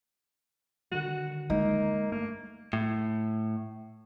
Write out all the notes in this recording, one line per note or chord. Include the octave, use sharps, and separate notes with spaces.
D3 D#3 G3 F#4
G#3 A#3 D#4
G2 A3 A#3
A2